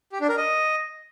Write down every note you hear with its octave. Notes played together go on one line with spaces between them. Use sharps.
G4
D4
A#4
D#5